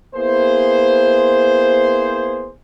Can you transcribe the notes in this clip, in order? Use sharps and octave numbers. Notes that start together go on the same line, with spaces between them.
A#3 B3 E4 G#4 C5